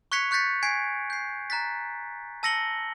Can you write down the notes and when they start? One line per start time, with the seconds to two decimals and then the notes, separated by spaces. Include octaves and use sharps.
0.12 C#6 F#6 G#6 B6 C#7 F7
0.31 C#6 F#6 G6 A6 B6 C#7
0.63 G#5 G#6 B6 C7 D7
1.10 G6 C7
1.50 A#5 F#6 A6 B6
2.43 A5 E6 A#6 C#7 F#7 G7